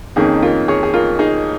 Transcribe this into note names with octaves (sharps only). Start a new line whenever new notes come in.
F2 D#3 A#3 C#4 D#4 G#4
F4 A#4
G#4 C#5
G#4
F4 A#4
D#4 G#4